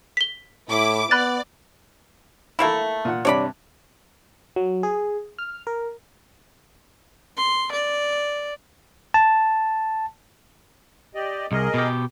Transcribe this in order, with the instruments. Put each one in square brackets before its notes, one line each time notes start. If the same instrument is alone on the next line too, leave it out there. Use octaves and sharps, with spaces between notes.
[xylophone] B6 G7
[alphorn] A2 [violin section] E4 D6
[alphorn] B3 [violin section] D5 [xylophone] B5 F#6 A6
[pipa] A3 A#3 E4 [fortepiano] A4 A#5 B5
[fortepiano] A#2 F#5
[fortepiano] G2 C3 [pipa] C#5 D5 B5
[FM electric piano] F#3
G#4
F6
A#4
[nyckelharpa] C6
D5
[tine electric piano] A5
[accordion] G4 D5 D#5
[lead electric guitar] C2 [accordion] G#4 A#4 D#5
[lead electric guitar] B2 G4